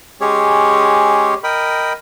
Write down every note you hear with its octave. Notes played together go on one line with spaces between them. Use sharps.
G#3 C#4 G4 G#4 C#5
A#4 D#5 G5 B5